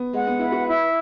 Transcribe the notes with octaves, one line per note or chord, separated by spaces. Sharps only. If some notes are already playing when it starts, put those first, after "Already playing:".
Already playing: B3
G#3 F#5
B3
E4 B4
F#4
E4